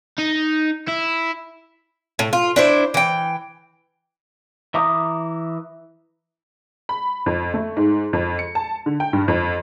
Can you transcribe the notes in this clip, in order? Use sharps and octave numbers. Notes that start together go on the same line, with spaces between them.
D#4
E4
A2
F4
D4 E4 C5
E3 G5
E3 E5 A#5 D6 D#6
B5
F2
A3
G#2
F2
C#7
A5
D3
G5
G2
F2